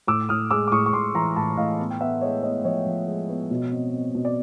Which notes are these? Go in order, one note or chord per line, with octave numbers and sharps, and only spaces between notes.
A2 D6 E6
A2 D#6 F6
G#3 D6 E6
D6
A2 C#6 D#6
C#6
A2 C6 D6
E3 A#5 C6
A2 A5 B5
A2 D#5 F5
B3
G5
B3 E5 F#5
G#3 C#5 D#5
B3 C#5 D#5
F3 C#5 D#5
F3
G#3
B3
B2
C4
C4
B2
D5